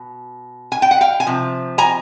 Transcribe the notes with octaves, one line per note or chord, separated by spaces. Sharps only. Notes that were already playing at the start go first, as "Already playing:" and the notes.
Already playing: B2
G#5
G5
F#5
F5 G5
G#5
C3 F3
G#5 A#5